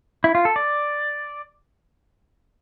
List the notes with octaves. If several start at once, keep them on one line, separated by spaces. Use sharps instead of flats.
E4
F4
A4
D5